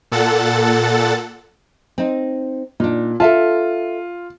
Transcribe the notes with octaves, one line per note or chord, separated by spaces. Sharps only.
A#2 A4 F#5 A6
C4 D#4
A#2 D4 D#4
F4 A4 E5 A5